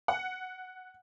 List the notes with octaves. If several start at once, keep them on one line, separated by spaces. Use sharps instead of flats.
F#5